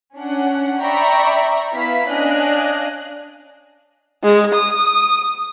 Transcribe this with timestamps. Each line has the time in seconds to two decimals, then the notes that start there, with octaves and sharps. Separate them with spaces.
0.16 C#4 D4 F#5
0.81 D5 E5 G5 A#5 B5 C#6
1.73 B3 E4 F5 B6
2.10 C#4 D4 D#5 F5 G#5 F#6
4.23 G#3
4.54 D#6